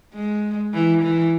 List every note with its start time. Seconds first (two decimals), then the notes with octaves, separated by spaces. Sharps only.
0.14 G#3
0.74 E3
1.03 E3